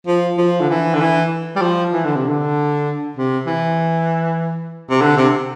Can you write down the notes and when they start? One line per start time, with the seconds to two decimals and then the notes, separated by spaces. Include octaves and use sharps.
0.07 F3
0.38 F3
0.60 D3
0.69 E3
0.94 D3
1.01 E3
1.56 G3
1.62 F3
1.93 E3
2.04 D3
2.16 C3
2.29 D3
3.17 C3
3.47 E3
4.90 C3
5.01 D3
5.17 C3